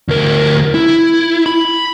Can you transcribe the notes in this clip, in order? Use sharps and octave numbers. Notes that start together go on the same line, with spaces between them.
D2 A#4
E4
B5